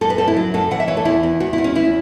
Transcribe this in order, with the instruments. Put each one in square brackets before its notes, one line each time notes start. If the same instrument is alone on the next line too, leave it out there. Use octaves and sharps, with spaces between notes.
[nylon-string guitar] F#2 A4
B4
F#2 A4
E4
F#3
F#2 A4
E3 F#5
E5
E3 C#5
A4
E2 E4
E2
E2 F#4
E4
E2
C#4
E2 E4